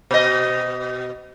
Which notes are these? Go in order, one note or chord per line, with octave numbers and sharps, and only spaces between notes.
B2 D#5